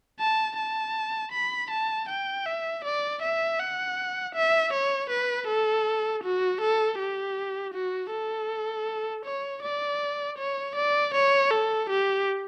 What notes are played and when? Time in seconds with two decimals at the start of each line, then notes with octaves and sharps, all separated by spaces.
0.20 A5
0.57 A5
1.32 B5
1.70 A5
2.09 G5
2.46 E5
2.84 D5
3.22 E5
3.59 F#5
4.35 E5
4.73 C#5
5.10 B4
5.48 A4
6.23 F#4
6.61 A4
6.99 G4
7.74 F#4
8.11 A4
9.25 C#5
9.63 D5
10.38 C#5
10.76 D5
11.14 C#5
11.51 A4
11.90 G4